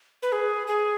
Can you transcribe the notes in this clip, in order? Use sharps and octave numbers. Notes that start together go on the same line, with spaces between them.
B4
G#4
G#4